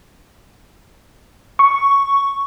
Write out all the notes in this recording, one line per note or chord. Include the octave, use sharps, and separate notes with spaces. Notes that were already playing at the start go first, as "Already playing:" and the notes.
C#6